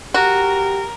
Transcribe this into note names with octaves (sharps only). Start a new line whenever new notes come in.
F#4 G4 A#4